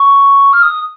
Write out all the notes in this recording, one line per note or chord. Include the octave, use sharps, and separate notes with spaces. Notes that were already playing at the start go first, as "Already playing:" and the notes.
Already playing: C#6
F6
D#6